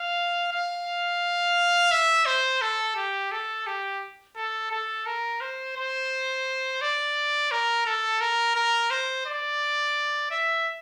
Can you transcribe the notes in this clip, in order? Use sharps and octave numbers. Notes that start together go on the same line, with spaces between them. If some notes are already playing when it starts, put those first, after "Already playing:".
Already playing: F5
F5
E5
C5
A4
G4
A4
G4
A4
A4
A#4
C5
C5
D5
A#4
A4
A#4
A#4
C5
D5
E5